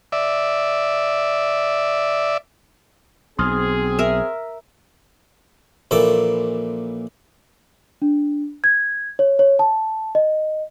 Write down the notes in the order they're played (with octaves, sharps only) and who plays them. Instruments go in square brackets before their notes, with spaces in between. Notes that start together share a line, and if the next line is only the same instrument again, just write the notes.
[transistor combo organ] D5 E5
[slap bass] B1 [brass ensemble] C4 G#4 [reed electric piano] C6 D#6 F6
[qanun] A#4 E5
[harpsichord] A#1 A#2 E3 A4 D6
[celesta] D4
G#6
C#5
C#5
A5
D#5